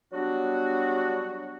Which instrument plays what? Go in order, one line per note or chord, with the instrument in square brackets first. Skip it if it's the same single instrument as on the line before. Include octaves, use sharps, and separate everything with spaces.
[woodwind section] F#3 G3 B3 D4 F#4